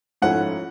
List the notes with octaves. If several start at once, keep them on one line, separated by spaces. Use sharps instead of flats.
G#2 F3 A3 C#4 E4 F#5